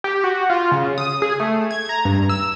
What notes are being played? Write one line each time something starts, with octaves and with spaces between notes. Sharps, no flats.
G4
F#4
F4
C#3
D#6
G#4
A3
G#6
A#5
G2
E6